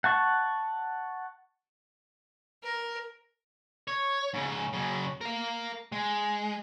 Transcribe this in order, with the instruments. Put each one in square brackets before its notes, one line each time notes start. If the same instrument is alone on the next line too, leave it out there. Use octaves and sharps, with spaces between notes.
[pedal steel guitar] F#5 A5 C#6
[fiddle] A#4
[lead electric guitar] C#5
G#2 C#3
F#2 C#3
A#4 F5
G#3